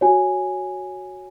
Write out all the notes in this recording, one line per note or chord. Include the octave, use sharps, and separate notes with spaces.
F#4 C#5 G#5